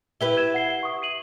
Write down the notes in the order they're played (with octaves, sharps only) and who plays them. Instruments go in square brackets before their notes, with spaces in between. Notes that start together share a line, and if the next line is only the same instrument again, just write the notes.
[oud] E4 G4 B4 [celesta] G7
[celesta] G#6 E7
F#5 C7 G7
C#6 D#6
C7 D#7 F#7